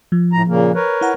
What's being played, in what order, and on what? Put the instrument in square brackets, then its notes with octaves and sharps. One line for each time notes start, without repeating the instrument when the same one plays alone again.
[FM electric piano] F3
[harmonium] A2 A#5
A#2 C#3 A#3
A#4 B4 C#5
[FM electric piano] E4 F#5 A#5